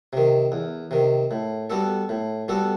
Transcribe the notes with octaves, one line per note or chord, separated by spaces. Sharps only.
C3 D#3
E2
C3 D#3
A2
G3 B3 F#4 A4
A2
G3 B3 F#4 A4